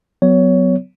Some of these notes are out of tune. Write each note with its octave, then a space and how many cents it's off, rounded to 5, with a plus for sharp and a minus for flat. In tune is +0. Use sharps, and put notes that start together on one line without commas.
F#3 +0 B3 +30 C#5 +20